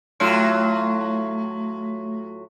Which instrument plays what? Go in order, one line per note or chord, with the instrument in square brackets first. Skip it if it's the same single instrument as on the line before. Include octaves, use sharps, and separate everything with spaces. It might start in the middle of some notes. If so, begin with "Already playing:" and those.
[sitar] A2 F#3 F4 [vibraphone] A3